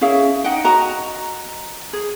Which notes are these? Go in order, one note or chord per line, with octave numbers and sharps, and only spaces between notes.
C#4 E4 G#4 F5
D#4 D#5 F#5 G5
F#4 D#5 A#5
G#4